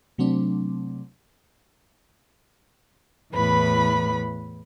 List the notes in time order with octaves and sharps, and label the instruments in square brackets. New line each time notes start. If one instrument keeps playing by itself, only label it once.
[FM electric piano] C3 F#3 A3 C4 D4
[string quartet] E2 A2 B4 B5